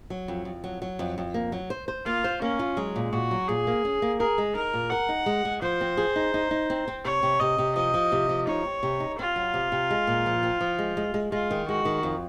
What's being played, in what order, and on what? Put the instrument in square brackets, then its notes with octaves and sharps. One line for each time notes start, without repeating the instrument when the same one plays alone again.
[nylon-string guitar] F#3
F2
F2
F#3
F#3
F2
F2
A#3
F#3
C5
C5
[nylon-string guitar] A#3 [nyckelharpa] F4
[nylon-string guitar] C5
[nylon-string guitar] A#3 [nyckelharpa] C#4
[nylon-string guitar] F4
[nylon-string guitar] F#3 [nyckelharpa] G#3
[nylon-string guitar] A#2
[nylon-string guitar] A#2 [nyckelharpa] F#4
[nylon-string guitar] F#3
[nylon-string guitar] A#2 [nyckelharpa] G#4
[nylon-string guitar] A#3
C#4
A#3
[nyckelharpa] G#4 [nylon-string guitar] A#4
[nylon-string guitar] G#3
[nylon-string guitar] D#4 [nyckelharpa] A#4
[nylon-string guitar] A#2
[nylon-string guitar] A#4 [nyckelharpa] F#5
[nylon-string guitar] D#4
G#3
G#3
[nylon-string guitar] F3 [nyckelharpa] C5
[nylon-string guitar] C4
G#4
D#4
D#4
D#4
C4
C4
[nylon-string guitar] C3 [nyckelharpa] C#5
[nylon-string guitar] C3
[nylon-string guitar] C3 [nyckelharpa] D#5
[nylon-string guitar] C3
[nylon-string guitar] F3 [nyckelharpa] D#5
[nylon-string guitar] F3
C3
F3
[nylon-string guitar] D#4 [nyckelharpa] C#5
[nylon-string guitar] C4
C3
D#4
[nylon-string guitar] C4 [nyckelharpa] F4
[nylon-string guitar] F#3
C3
C3
G#3
A#2
F3
C4
F3
G#3
G#3
G#3
[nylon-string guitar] G#3 [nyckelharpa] F4
[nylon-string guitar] D#3
[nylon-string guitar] G#3 [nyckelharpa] F#4
[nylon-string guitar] D#3
F2